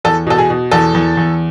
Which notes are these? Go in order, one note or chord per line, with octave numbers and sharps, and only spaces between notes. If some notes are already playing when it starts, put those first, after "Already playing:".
E2 A4
B2 A4
G#4
B2
E2 A4
E2
E2